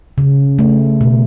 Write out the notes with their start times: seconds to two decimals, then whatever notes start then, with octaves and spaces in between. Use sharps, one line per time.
0.18 C#3
0.59 A3
1.01 B2